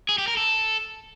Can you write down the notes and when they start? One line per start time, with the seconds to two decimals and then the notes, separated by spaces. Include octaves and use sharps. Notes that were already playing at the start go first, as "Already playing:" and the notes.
0.09 G#4
0.18 G4
0.28 A#4
0.37 A4